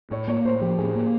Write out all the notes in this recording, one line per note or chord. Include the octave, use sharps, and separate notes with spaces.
A2 C#5
A#3 C#5
A2 C5
F3 G4
A2 G#4
A#3